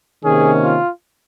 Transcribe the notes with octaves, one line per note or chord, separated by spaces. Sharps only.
C3 D#3 A#3 C#4 G#4
F4